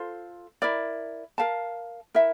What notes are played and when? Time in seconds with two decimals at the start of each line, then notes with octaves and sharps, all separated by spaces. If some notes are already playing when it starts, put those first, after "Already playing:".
Already playing: F4 A4 C5
0.62 E4 A#4 D5
1.38 A#4 F5 A5
2.15 E4 A#4 E5